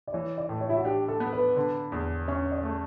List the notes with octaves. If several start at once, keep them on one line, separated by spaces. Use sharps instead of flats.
D5
E3 C#5
D5
A2
C#5
E4
F#4
D4 G4
A4
B3
B4
D3
E2
C#4 C#5
D5
A3